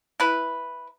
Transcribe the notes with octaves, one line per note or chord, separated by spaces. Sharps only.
E4 B4